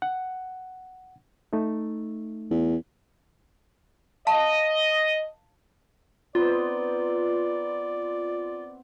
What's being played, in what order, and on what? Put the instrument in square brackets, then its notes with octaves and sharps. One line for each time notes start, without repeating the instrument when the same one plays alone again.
[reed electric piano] F#5
A3 D#4
[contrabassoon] E2
[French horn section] D#5 [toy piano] F5 A5
[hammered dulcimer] B3 C4 D#4 [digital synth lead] F4 [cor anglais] D5